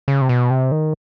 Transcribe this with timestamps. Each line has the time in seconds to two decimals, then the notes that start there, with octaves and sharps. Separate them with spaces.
0.08 C#3
0.21 C3
0.29 B2
0.50 C3
0.71 D#3